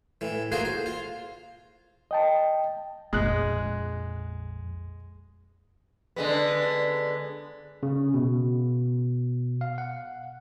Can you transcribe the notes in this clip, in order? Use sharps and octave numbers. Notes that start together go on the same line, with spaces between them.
A2 E3
A3 A#3 F4 F#4 G#4 C5
C5
F4
D#5 G5 A5
A#1 F2 G#3 F#6
D3 G#3 B3
C#3
B2
F5
F#5